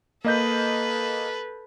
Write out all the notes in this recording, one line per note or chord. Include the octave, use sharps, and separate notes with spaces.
A#3 A4 B4 D#5 G6